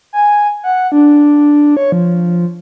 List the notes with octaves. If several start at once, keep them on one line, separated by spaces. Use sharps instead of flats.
G#5
F#5
D4
C#5
F3